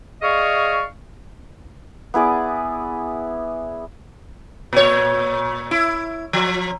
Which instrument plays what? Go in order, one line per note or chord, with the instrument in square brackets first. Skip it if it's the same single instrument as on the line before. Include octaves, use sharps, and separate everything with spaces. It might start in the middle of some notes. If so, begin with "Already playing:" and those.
[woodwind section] G#4 D5 D#5 F5 C#6
[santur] B3 E4 G#4 D5
[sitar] A#2 C#5
E4
F3